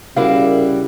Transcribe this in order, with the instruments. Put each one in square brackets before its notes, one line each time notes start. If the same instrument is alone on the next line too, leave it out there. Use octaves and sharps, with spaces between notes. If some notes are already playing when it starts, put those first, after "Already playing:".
[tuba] C#3 [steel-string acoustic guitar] G3 E4 F#4 [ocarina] A#4 [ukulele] F5